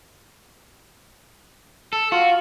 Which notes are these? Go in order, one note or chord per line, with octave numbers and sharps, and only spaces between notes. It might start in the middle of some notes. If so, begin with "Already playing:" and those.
A4
F4 F#4